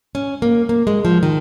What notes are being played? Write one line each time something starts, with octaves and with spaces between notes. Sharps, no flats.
C#4
A#3
A#3
G#3
F3
D#3